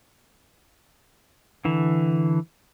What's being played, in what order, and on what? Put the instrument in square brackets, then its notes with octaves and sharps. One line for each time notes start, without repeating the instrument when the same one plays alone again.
[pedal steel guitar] D3 E3